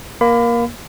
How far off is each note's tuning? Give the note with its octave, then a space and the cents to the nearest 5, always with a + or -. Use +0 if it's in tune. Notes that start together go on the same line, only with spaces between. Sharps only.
A#3 +15 B5 +30